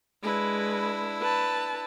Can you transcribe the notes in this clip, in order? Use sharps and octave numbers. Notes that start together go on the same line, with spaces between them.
G#3 D4 E4 B4
B4 A5